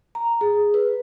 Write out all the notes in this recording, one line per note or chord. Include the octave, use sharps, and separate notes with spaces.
A#5
G#4
B4